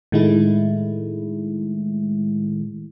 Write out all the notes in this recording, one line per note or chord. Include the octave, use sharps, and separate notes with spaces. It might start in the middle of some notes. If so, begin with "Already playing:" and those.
A2 D#3 G#3 A3 E4